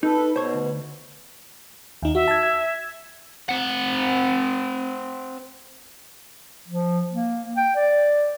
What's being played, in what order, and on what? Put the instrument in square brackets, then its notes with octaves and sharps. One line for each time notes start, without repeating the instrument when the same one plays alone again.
[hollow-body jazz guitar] D#4 [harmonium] A4 B4
[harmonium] B2 [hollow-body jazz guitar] C5 C#5
[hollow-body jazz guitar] D2
[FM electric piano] D#2 D#4
[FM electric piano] F#4 [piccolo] E5
[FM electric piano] A5 G#6
G#6
[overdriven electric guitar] C4 F#5
[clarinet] F3
A#3
G5
D5